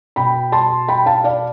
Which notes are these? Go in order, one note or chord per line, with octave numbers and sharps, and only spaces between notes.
B2 G5 B5
A5 C6
G5 B5
F5 A5
D5 F5